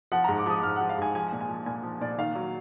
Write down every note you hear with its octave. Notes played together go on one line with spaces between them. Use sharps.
F3 F#5
G#2 A#5
D6
F3 D#6
G#2 F6
F3 F#5
F5
G#2 G#5
F3 G#5
A#2
G#5
F3
A#2 G#5
F3
A#2 D5
D#3 F5
F#3